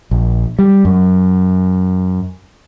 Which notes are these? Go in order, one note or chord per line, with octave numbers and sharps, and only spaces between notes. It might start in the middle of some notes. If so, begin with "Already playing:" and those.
A#1
G3
F#2